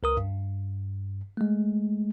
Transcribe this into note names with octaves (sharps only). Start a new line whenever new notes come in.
C#2 A#4 D#6
G2
G#3 A3